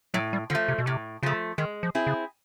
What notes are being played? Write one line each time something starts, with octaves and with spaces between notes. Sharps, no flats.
A2 F#3
G3
D3 F3 A3
C3
B2
A2 C3
C#3 F3 A3
D#3 G#3
F3
C4 E4 G#4
C#3